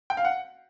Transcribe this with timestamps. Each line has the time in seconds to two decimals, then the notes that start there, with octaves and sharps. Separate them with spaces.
0.10 G5
0.17 F5
0.25 F#5